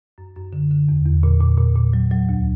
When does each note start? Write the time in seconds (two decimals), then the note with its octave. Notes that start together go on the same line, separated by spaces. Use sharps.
0.18 F#2
0.36 F#2
0.53 D3
0.71 D3
0.89 E2
1.06 E2
1.23 A#2
1.41 A#2
1.58 A#2
1.76 A#2
1.93 F#3
2.11 F#3
2.29 D2